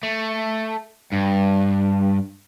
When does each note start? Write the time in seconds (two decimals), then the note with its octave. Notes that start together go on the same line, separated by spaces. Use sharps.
0.03 A3
1.13 G2